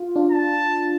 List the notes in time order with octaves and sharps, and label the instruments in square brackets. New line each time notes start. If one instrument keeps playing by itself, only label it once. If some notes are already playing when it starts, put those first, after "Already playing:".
Already playing: [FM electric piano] F4
D4 F4
[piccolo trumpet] A5